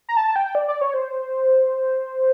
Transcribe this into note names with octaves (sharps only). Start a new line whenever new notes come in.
A#5
A5
G5
D5
D5
C#5
C5